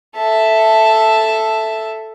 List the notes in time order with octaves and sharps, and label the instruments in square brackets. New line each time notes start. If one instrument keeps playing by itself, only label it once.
[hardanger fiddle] A4 E5